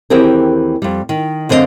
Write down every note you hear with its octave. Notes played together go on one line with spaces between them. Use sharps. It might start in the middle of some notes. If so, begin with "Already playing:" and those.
D#2 E3 C4 G4 G#4 A#4
F2 G3
D#3
F#2 D3 C4 F#4 D#5 F5